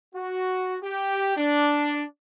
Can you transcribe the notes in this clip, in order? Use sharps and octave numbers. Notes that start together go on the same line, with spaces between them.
F#4
G4
D4